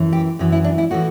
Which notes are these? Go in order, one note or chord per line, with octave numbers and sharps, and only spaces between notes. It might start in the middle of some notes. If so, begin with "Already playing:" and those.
Already playing: F#2 E3
G4
F#2 E3
E4
D4
E4
A2 E3 F#4